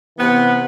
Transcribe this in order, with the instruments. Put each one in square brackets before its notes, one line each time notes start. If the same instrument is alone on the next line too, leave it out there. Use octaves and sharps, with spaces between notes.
[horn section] C3 E3 B3